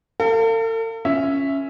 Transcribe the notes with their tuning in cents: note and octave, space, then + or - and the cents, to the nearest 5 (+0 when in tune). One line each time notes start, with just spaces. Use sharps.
A4 +45 F5 -15
C#4 +0 F4 -25 E5 +0